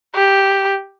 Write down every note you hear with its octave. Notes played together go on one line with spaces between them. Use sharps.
G4